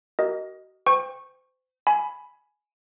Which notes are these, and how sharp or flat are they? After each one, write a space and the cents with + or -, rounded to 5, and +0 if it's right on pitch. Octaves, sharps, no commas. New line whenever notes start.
F#4 +35 A#4 +0 D#5 +0
C5 -30 G5 +25 C#6 -15
G#5 +15 B5 +0